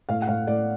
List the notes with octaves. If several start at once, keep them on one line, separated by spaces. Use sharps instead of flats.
A2 F5
F#5
A2 F5
A2 D5